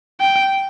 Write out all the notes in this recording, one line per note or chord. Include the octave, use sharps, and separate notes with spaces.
G5